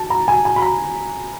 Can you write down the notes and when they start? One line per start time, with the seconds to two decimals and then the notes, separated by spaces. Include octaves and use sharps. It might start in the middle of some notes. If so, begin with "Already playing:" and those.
Already playing: A5
0.10 A#5
0.28 G#5
0.45 G#5
0.56 B5
0.62 A#5